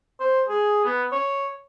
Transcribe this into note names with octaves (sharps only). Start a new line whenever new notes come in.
C5
G#4
B3
C#5